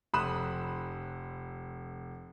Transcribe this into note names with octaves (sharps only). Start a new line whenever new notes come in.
F1 B5 C6 D#6 F#6 E7